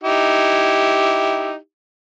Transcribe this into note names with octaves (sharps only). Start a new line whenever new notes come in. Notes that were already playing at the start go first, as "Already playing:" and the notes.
D#4 E4 G4